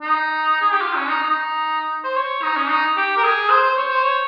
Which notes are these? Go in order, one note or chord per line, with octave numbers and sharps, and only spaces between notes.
D#4
G#4
G4
F4
C#4
D#4
D#4
C5
C#5
D#4
C#4
D#4
G4
A#4
G#4
C5
C5
C#5
C5
C#5